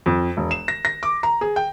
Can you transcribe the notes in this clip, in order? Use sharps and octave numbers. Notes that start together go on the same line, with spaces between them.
F2
E1
E7
A#6
A#6
D6
A#5
G#4
G5